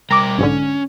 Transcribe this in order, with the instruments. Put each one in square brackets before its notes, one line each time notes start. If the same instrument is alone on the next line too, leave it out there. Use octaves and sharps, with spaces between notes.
[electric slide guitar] G3 A#4 G5 [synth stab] A#5 D6
[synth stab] B1 G#2 D3 [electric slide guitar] C#4